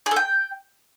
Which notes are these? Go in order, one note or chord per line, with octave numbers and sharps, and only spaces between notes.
G#4
A4
G5